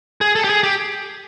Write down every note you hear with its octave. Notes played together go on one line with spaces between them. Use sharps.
G#4
A4
G4
G#4
G4